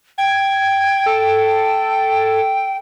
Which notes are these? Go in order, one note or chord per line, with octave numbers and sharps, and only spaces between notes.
G5 G#6
A4